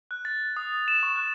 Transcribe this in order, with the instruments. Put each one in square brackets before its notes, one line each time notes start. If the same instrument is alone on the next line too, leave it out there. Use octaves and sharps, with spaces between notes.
[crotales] F#6
A6
D#6
E7
C#6
F#6